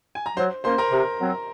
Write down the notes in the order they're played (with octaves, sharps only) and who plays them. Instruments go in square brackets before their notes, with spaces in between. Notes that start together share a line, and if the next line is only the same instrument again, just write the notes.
[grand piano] G#5
A#5
[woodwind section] F#3 [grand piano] C5 C6
[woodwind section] A#3 C#4 [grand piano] C5 C6
[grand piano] A#4 A#5
[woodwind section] C3
F#3 C4